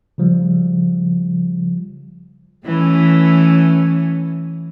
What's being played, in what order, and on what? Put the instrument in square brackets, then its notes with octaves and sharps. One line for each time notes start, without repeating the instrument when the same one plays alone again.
[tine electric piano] C#3 F3 G3
[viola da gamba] E3 A3 C#4